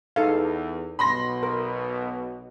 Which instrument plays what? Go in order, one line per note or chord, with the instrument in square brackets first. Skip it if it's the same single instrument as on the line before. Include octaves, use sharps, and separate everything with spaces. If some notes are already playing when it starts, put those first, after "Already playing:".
[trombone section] E2 [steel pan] D#4 A4 F5
[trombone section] B1 B2 [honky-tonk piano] B5 C6 A#6
[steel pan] A#4